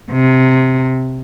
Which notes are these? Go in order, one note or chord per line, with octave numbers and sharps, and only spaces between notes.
C3